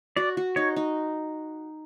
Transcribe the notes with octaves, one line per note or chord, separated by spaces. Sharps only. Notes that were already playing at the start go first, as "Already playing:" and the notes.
F#4 D5
F#4
D#4 C#5
D#4